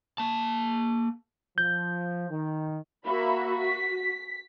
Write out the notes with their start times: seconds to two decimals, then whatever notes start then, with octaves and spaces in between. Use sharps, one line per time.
0.18 A#3 A5
1.58 F3 G6
2.30 D#3
3.06 A#3 F#4 E5 B5
3.60 B6